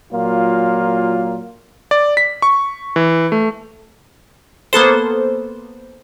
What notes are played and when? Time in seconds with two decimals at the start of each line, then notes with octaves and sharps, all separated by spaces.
0.12 A#2 F#3 A#3 F4
1.91 D5
2.17 B6
2.42 C#6
2.96 E3
3.32 A3
4.73 A#3 B3 A4 C5